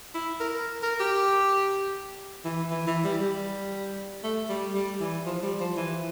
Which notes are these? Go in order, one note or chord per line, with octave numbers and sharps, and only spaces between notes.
E4
A#4
A#4
G4
E3
E3
E3
G3
G3
A3
G3
G3
E3
F3
G3
F3
E3